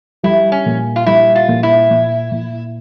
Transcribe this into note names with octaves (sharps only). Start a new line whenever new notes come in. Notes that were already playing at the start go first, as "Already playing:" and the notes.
G3 E4
C#4
A#2
F4
G3 E4
F4
A#2
E4
A#2
A#2